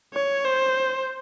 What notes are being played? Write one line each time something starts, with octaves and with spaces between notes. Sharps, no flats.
C#5
C5